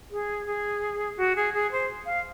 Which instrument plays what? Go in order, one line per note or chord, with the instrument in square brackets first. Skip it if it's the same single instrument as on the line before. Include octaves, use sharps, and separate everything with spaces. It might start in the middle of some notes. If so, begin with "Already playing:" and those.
[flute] G#4
G#4
F#4
G#4
G#4
C5
F5